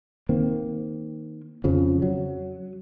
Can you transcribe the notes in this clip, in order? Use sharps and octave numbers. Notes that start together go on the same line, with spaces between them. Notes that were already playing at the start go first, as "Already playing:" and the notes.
D#3 A#3 C4
F2 C#3 F3
F#3